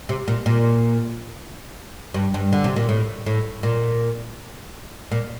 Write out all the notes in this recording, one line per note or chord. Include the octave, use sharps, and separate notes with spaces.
C3
A#2
A#2
G2
G2
D3
C3
A#2
A2
A2
A#2
A#2